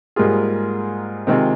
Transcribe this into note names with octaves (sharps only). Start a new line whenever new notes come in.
G#2 G3 A#3 F4 G#4
C3 D#3 G#3 C4 F4